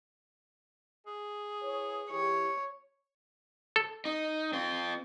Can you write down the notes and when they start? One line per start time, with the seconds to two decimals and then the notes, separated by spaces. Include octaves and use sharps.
1.07 G#4
1.62 E4 B4 C#5
2.10 E3 E4 G4 C#5
3.76 A4
4.05 D#4
4.53 C4 F4